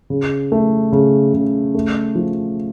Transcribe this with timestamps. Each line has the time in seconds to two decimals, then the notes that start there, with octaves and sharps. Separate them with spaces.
0.10 C#3
0.52 A3
0.92 C#3
1.34 C#3
1.74 A3
2.15 F3